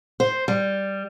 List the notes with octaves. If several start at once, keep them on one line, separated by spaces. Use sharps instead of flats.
C5
G3